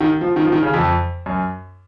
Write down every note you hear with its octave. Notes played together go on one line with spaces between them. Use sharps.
D#3
F3
D#3
F3
D#3
C#3
F2
F#2